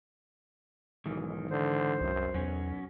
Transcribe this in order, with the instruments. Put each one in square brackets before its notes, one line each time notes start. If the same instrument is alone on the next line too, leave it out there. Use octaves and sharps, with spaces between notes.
[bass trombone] B1 [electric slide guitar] G#2 D#3 E3
[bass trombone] D3 [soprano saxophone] C5
[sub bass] C2 [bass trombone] F#2
[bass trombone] B1 [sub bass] E2 [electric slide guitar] F#3 C#4